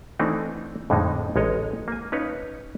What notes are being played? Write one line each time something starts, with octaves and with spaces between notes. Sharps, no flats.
E3 A3 C4 D4 D#4
F2 A2 D3 G#3 D#4
A1 G#3 C#5 D#5 A#5
A#3 G#5
C#4 D#4 B4 C#5 F5